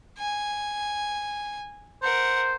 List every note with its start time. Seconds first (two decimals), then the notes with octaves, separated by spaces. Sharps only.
0.18 G#5
2.03 A#4 C5 F#5